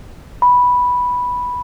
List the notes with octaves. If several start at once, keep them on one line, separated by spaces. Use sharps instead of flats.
B5